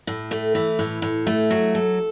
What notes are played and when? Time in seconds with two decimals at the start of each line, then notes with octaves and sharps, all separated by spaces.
0.07 A2
0.31 A3
0.55 E3
0.79 A2
1.02 A2
1.27 A3
1.50 F#3
1.75 A4